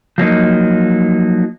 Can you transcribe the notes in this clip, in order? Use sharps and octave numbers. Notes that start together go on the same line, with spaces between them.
F3 F#3 A#3 D#4